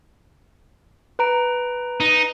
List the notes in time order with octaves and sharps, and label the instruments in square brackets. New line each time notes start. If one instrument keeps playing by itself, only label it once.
[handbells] B4 A#5 D7
[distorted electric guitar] D#4